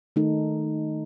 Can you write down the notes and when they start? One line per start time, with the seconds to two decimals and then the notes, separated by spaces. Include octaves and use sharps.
0.16 D#3 A3 D#4 A4